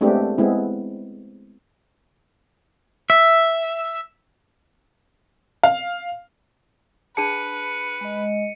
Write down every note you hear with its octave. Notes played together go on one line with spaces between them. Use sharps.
G#3 A3 B3 C4 D4 G4
G#3 B3 C4 E4
E5
F5
D4 G#4 B4 A5 C#7 D#7
G#3 D#5